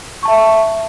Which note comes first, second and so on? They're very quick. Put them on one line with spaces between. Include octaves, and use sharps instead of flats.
C#6 A5 E5